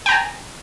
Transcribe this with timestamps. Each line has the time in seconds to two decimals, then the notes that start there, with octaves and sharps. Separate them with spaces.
0.06 G5
0.09 A#5
0.12 G#5